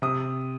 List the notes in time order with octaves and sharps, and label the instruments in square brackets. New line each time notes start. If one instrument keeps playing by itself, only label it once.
[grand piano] C3 D#6